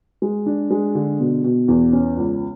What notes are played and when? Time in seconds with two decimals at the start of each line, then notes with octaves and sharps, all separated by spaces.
0.22 G#3
0.46 D4
0.70 G#3
0.95 D3
1.20 B2
1.44 B2
1.68 E2
1.93 C#4
2.17 C#2